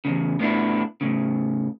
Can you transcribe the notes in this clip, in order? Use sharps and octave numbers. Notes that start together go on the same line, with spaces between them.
E2 G#2 C#3
A2 B3 D4 E4
A2 C#3